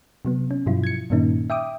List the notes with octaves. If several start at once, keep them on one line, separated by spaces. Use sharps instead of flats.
C3 F#3 B3
C#4
G2 B2 F3 F#3 E4 F4
G#6 C#7
G2 A#2 D#3 A#3 C#4 D#4
E5 G5 D6 D#6